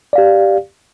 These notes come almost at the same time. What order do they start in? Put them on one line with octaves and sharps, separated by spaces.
D5 F5 G4